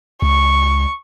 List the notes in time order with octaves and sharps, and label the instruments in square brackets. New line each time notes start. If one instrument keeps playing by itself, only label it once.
[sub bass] C#2 [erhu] C#6